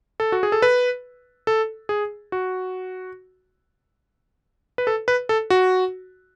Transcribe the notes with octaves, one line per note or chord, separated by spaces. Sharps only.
A4
F#4
G#4
A4
B4
A4
G#4
F#4
B4
A4
B4
A4
F#4